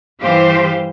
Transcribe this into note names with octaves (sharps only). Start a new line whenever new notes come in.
G2 E3 G4 C5 F5